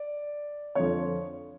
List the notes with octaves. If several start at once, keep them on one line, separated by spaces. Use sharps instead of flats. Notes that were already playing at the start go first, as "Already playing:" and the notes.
Already playing: D5
F2 D3 F3 C#5